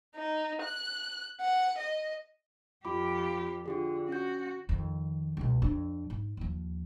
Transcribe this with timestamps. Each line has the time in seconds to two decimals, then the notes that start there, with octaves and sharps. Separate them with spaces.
0.16 D#4
0.62 F#6
1.41 F#5
1.79 D#5
2.85 F2 F4 G4 B5 D6
3.66 D3 F4 G4 G#4
4.09 C#4 F#4 G6
4.69 F2 D#3
5.37 C#2 B2
5.62 F2 D4
6.10 G#2
6.37 D#2 F3